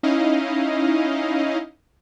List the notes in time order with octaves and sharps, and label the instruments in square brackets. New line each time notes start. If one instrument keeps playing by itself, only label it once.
[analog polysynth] C#4 D#4 E4 D#5 F5